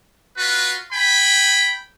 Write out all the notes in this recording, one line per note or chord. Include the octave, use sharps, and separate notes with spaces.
F4 F#4 B4
G5 G#5 B5